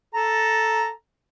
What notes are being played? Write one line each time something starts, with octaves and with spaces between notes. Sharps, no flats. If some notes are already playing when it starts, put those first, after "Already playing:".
A4 A#5